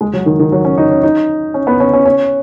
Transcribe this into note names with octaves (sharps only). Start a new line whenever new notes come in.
G#3
F#3
D#3
D#3
F#3
C#4
D#4
C#4
D#4
C#4
B3
C#4
C#4
C#4